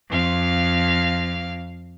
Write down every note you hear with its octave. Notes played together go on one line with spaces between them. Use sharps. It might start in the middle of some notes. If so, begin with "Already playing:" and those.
F2 F5